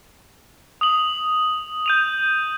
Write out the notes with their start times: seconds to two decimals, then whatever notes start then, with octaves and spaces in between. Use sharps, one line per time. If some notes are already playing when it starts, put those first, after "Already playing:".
0.81 D#6 F#7
1.86 G6 D#7 F7